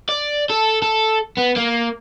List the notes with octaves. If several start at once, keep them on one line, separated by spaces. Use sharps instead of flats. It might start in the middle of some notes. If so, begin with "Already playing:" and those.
D5
A4
A4
B3
A#3